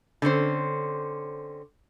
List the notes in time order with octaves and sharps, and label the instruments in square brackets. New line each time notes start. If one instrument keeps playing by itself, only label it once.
[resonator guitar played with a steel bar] D3 C4 C#4 C5